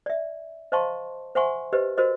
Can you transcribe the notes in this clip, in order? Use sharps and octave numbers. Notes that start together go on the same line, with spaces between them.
D5 E5
C5 D#5 F5 A5 C6 C#6
C5 E5 F#5 G#5 C6 C#6
G4 B4 C5 D#5
F#4 A#4 C5 D#5